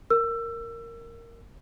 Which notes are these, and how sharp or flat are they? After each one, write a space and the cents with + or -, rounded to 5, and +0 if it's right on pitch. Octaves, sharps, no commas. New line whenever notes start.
A#4 -10 E6 +25